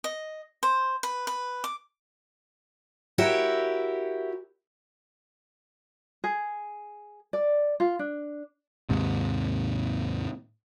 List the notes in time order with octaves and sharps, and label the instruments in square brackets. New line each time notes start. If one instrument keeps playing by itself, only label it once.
[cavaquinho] D#5
C5
B4
B4
D6
[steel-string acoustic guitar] E4 F#4 G4 A#4 C#5 E5
[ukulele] G#4
D5
F4
D4
[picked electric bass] D#2 G#2 C3